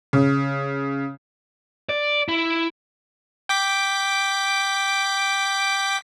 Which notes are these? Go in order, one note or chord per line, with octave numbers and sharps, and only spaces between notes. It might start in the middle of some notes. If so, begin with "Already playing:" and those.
C#3
D5
E4
G5 D6 B6